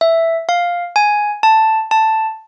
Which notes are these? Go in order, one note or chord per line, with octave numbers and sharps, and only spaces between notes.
E5
F5
G#5
A5
A5